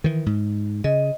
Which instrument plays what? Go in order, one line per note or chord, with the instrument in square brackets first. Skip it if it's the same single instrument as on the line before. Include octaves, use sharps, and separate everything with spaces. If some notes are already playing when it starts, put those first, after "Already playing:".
[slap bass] D#3 E3
G#2
[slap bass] C#3 [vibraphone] D#5